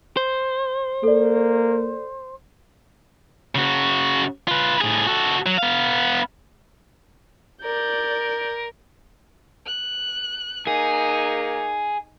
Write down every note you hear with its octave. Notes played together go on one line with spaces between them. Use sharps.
C5
A#3 A4 D5
C#3 F#4
F4 B4
A2 G#4
F#4 A4
F#3
B3 F5
A#4 D5 G6
F#6
A#3 D#4 G#4